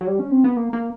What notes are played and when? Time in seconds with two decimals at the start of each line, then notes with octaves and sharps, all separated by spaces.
0.01 F#3
0.07 G3
0.19 C#4
0.31 C4
0.44 B3
0.57 A#3
0.73 A#3